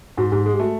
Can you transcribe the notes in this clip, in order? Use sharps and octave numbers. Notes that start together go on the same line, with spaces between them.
G#2 F#4
G#2 G4
G#3 G#4
G4
A3 F#4